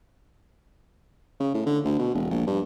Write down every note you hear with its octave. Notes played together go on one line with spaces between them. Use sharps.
C#3
A2
D3
D2
B2
E1
A#1
G2